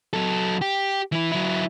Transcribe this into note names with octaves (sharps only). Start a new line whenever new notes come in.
F#3 A4
G4
E3 E4
F#3 E4